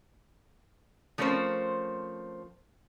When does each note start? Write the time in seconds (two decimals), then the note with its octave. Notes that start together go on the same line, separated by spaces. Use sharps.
1.18 F3 A3 C4 C#4 A#4 C5